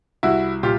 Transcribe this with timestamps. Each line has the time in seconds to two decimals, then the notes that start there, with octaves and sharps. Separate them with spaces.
0.23 C2 E4 F#4
0.63 A#2 F4 G4